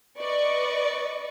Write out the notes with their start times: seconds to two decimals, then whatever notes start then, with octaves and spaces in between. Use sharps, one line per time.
0.19 B4 D5 D#5 C#6